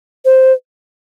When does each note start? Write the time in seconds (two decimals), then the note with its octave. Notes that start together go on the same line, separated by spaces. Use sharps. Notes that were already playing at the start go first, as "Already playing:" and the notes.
0.25 C5